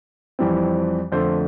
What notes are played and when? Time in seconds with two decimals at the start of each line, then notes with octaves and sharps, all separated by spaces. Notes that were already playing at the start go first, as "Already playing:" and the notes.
0.39 F2 E3 G3 C4
1.12 F2 D3 A3 C5